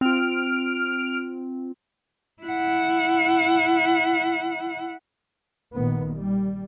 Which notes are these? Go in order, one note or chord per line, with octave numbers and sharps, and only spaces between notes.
C4 F4 F6 D7
E4 F#5
A#1 A#2 D#3 B3
G3